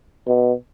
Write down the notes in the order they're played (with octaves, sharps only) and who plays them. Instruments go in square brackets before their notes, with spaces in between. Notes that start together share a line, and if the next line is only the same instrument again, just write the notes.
[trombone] B2